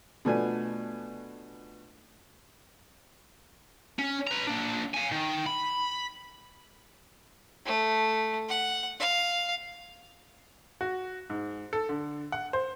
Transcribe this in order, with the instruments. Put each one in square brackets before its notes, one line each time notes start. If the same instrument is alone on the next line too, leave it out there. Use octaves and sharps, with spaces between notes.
[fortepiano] B2 F3 A3 B3 D4 G#5
[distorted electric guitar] C#4
B4 A#5
A#3 D4
F5 G#5
D#3
B5
[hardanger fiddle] A3
F#5
F5
[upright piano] F#4
G#2
A4
D3
F#5
C5